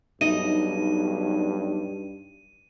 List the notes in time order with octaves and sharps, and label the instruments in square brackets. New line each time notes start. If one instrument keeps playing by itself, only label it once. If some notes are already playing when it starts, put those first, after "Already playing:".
[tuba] B1 [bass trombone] G2 [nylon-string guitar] D#4 D#5 [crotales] D#7